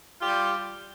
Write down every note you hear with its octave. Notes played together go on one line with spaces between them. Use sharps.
G3 F4 G4